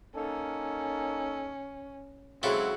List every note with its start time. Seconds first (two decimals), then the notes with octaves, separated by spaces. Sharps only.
0.16 A#3 C#4 D#4 A4
2.43 C#3 F#3 G#3 C4 E4 F#4 A4